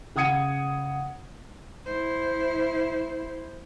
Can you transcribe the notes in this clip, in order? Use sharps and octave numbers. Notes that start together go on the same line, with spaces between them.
C#3 F#5 D#6 G#6 C#7 D#7
E4 C5